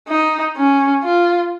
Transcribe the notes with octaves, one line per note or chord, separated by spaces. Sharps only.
D#4
C#4
F4